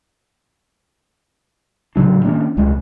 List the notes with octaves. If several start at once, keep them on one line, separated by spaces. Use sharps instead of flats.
A2 C#3 F#3 D4
D#3 A#3 C#4 D4
E1 C#2 C#3 G#3